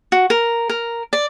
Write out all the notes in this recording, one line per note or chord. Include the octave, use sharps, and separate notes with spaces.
F#4
A#4
A#4
D5